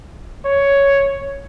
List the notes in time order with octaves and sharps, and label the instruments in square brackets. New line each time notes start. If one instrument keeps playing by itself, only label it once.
[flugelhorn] C#5